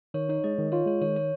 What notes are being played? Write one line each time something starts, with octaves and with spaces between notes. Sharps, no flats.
D#3 C#5
D#4 C#5
G#3 D#5
D#3
F4 C#5
G#3 C#5
D#3 C#5
C#5